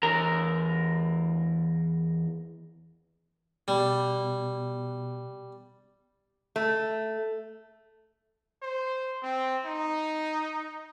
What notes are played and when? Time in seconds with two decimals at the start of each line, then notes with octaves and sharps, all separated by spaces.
0.03 E2 A#4 A#5
3.68 B2 G3
6.56 A3
8.62 C5
9.23 C4
9.65 D#4